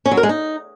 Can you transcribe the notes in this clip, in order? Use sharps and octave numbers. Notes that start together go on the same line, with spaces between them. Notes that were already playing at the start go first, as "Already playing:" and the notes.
C#4
F#3
A#4
G#3
D#4